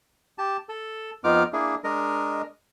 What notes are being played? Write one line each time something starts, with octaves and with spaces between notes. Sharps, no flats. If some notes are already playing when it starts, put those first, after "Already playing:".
G4 A5
A4
F2 B3 D#4 F4 D6 F6
A#3 D4 E4 G#4
G#3 D4 A#4 D#5